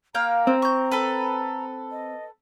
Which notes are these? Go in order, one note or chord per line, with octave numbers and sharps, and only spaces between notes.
A#3 F5 G5 A#5
C4
C#6 G6
A4 B4
D#5